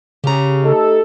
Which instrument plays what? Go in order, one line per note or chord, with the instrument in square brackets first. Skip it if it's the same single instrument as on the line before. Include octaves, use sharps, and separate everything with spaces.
[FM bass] C#3 [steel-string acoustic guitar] G4 A#5
[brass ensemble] A3 D#4 A4